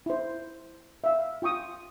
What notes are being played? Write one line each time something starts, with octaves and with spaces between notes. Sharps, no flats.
E4 C5
E5 F5
F4 G5 C#6 D#6